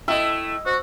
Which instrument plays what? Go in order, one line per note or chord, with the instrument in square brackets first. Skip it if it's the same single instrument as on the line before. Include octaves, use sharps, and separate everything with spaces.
[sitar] A3 E4 [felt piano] D#5 E6 [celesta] G5
[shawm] F#4 [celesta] C5